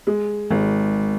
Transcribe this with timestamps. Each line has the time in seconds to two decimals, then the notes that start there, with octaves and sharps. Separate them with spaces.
0.07 G#3
0.50 G#1